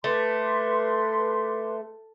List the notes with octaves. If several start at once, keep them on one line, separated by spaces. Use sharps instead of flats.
A3 B4 C6 D6